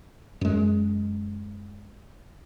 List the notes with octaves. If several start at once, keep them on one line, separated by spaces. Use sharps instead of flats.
F#2 G#3